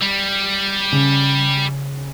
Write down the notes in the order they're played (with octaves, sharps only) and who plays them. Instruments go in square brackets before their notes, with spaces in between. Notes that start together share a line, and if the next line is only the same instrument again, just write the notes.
[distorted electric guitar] G3
[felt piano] C#3